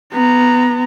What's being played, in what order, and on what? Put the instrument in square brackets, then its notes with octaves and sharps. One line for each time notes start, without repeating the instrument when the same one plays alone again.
[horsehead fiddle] B3 A#5